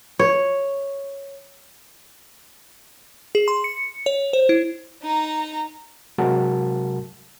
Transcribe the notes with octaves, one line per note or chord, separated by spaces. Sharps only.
C#5
G#4
C6
C#7
C#5
C5
E4
D#4 A#5
C3 F#3 G#3 F#4 A#4 A5